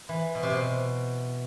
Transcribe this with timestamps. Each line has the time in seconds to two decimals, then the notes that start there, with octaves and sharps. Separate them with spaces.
0.09 E3
0.35 B2
0.43 C3
0.50 B2